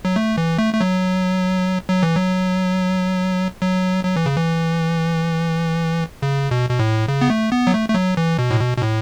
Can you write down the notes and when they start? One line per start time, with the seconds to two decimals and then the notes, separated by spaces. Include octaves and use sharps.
0.05 F#3
0.16 A3
0.38 E3
0.58 A3
0.74 A3
0.81 F#3
1.89 F#3
2.03 E3
2.16 F#3
3.62 F#3
4.05 F#3
4.16 E3
4.26 C#3
4.37 E3
6.22 C#3
6.51 B2
6.70 B2
6.79 A2
7.08 C#3
7.21 B3
7.30 A3
7.52 B3
7.67 F#3
7.74 A3
7.89 A3
7.94 F#3
8.17 E3
8.39 B2
8.51 A2
8.60 B2
8.77 B2
8.82 A2